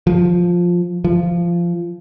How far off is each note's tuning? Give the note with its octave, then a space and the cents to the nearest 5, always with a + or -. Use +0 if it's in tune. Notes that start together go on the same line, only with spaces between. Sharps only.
F3 +5
F3 -15